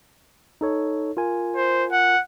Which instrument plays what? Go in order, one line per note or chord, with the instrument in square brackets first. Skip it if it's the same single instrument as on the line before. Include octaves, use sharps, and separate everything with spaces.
[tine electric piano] D#4 A4 C#5
F4 A#4 G#5
[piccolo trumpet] C5
F#5